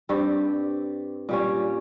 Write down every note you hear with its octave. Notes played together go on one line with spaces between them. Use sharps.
G2 G3 C4 G4
A#2 G3 C#4